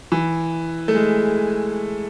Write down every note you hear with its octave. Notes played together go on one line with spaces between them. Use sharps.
E3
A3
G#3